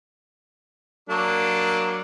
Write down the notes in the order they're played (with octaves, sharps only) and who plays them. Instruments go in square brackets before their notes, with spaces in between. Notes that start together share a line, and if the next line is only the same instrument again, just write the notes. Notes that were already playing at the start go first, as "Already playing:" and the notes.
[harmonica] F#3 A#3 D4